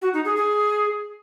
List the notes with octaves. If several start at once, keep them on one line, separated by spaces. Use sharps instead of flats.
F#4
D#4
G#4
G#4